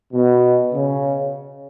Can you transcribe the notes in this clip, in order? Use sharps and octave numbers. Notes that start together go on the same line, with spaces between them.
B2
C#3